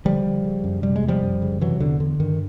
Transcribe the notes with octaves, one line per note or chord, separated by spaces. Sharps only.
D3 F3 G3
D3
C#3
F#2
C3 G3
G#3
E2
F3 G3
F#2
C#3
C3 E3 F#3
E2 D3
D3
G2 D#3